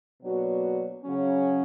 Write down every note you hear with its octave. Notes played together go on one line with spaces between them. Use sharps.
B2 F#3 A#3 D4 F#4
C#3 F#3 C#4